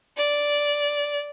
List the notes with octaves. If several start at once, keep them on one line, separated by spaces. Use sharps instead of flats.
D5